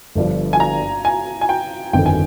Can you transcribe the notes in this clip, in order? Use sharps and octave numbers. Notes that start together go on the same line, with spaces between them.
G1 G2 F3
G#5
A#5
G#5
G#5
G5
G1 F2 D#3 G5
G#5